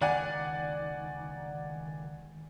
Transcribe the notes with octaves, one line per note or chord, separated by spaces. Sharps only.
C#2 D#3 D5 F#5 G#5